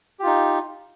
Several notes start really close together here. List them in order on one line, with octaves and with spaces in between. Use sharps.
G4 F4 D#4